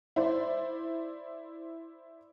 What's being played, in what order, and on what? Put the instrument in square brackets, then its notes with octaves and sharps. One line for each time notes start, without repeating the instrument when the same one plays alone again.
[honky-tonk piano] E4 C5 D5